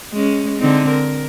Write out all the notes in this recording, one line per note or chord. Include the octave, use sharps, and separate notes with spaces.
G#3 C#4
D3 C4 D#4
A#4